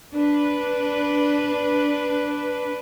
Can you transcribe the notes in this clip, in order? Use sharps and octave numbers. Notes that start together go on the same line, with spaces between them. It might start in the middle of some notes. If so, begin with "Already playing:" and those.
D4 B4